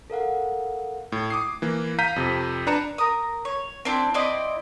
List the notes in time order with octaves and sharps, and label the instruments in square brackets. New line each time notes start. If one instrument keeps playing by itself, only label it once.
[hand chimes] A4 A#4 F5 F#5
[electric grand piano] A2
D6 D#6 C7
E3 A#3
F5 A#5 G6 B6 D#7
F2 C3
D4 B4 A#5 C#7 E7
[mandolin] A#4 D#6
C#5
C4 D4 E4
C4 E4 D5 D#5